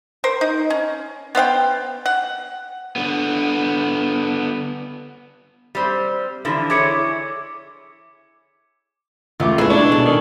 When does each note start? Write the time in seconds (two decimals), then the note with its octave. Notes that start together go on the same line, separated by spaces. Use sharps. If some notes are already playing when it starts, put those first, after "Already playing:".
0.24 A#4 C5
0.41 D#4
0.70 C#4
1.35 B3 C5 F5 G5
2.06 F#5
2.96 D3 B3
5.75 G3 C4
6.45 D3 E3 F3
6.70 E4 G#4 C#5 D6 G#6 C#7
9.40 C#2 A3 F4 D6
9.58 A#2 G#3 E4 G#4 A4 B4
9.70 D4 C#6
9.92 B2
10.06 D#3